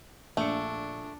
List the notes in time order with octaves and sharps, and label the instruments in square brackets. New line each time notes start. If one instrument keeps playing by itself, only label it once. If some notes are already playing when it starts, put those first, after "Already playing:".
[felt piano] A#1 C#7 [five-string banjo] A3 [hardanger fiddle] D4